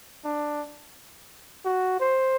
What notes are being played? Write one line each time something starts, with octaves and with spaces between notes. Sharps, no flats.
D4
F#4
C5